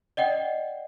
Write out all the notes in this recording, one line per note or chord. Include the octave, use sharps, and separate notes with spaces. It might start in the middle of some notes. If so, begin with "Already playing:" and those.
D5 D#5 F#5 G5